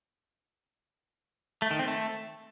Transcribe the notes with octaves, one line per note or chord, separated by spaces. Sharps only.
A3
D#3
C4
A3